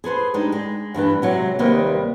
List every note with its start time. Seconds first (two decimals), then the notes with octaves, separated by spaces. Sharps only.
0.04 G#4 A4 B4 C5
0.34 G#3 D4 D#4 G4
0.52 G#3
0.94 G2 E3 D4 B4
1.22 C3 F#3 G#3
1.59 D#2 C3 G3 A#3 B4 D#5